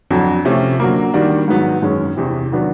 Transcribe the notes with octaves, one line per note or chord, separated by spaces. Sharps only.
F2 D3 F#3
C3 F3 A3 C#4
D3 F#3 A#3
D#3 G3 A#3 D4 F#4
G#2 D#3 F#3 B3
F#2 D#3 G#3 C#4
E2 C3 E3
D#3 F#3 B3 D4